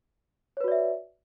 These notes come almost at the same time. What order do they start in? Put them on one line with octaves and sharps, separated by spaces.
C#5 B4 F#4 D5 E5